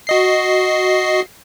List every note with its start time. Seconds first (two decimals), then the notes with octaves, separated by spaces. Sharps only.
0.07 F#4 D#5 C7